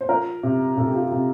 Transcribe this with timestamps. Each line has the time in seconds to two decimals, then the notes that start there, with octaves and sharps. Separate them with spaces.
0.01 C5
0.09 F3 A#4
0.43 C3
0.77 C3 A4
0.86 G4
0.95 F4
1.03 G4
1.12 C3